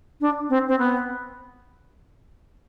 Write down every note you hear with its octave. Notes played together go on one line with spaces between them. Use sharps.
D4
C4
C4
B3